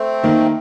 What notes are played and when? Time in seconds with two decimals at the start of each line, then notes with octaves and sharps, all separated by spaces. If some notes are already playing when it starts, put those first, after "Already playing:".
Already playing: A3 C4
0.23 D#3 A#3